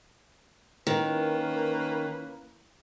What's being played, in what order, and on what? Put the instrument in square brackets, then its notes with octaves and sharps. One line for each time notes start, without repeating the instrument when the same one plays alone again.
[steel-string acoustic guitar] D#3 [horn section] A#3 C#4 B4